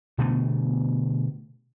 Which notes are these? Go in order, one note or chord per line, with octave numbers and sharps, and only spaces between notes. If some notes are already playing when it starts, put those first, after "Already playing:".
B2 D3 A3 B3